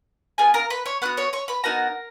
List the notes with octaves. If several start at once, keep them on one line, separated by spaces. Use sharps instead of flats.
B3 F4 G#4 G#5
A#4 A#5
B4 B5
C#5 C#6
B3 D#4 F#4 F#5 F#6
C#5 C#6
C#5 C#6
B4 B5
B3 D#4 F#4 A#4 A#5